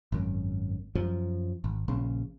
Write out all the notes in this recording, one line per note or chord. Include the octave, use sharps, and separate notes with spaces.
G#1 F#2
F#2 F3
G#1
A#1 C#3